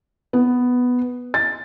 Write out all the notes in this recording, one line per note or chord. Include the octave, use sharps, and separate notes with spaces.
B3
A6